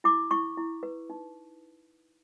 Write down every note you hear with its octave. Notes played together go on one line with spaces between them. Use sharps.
E4 D6
E4 C#6
E4
B4
D#4